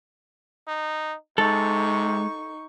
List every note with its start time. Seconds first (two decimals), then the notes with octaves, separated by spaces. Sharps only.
0.68 D#4
1.38 C3 G#3 D#4 A4 C#6